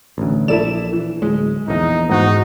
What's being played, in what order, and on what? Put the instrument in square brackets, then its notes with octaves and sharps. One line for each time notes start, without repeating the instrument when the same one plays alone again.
[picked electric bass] A1 D2
[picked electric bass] A#1 [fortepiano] E4 A4 D5 [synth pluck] E7
[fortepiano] E3
[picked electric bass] D1 [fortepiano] G#3
[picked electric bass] A#1 E2 [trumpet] D#4
[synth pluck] G#2 F#4 [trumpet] D#4